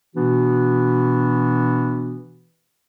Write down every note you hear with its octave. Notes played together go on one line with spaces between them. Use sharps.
B2 E3 B3 D4 F#4